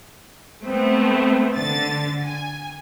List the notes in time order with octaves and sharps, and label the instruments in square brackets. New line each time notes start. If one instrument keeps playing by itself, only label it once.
[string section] A3 B3 C4
D3 A6
G#5